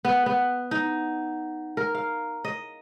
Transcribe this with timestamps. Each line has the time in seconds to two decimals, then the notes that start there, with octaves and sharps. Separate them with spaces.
0.05 B3
0.26 B3
0.71 D#4
1.77 A#4
1.95 F5
2.44 D#5